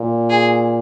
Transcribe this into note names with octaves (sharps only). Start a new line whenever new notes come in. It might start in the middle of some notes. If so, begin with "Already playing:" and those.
Already playing: A#2
G#4